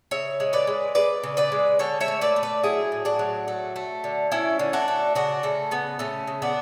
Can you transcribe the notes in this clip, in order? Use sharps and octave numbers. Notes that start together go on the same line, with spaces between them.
C#3 C#5 E5
G#3
B4 D5
G#3
G#3 B4 D5
C#3
B4 D5
G#3
D3 A4 C#5
C#5 E5
A3
B4 D5
A3
B4 D5
F#3 E4 G#4
A2
D4 F#4
F#3
A3
A3
D3
A3 C#4 E4
D3
D4 F#4
A3
C#3 D4 F#4
C#3 A3
C#3 B3
C#3 A3 C#4
C#3
B3 D4